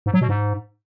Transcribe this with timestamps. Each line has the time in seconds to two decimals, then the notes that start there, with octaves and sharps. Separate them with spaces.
0.06 G#2
0.14 F#3
0.21 B2
0.29 G#2